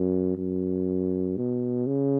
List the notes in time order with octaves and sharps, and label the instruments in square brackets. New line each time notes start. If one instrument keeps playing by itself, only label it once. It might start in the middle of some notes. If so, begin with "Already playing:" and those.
Already playing: [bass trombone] F#2
F#2
B2
C#3